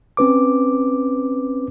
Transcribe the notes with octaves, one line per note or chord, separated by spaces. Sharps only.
C4 C#4 B4 D6